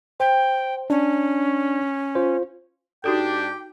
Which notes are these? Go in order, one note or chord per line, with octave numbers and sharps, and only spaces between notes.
C5 G5
C#4 D4
F4 C5
G#2 D4 D#4 F#4 G4 A4 G5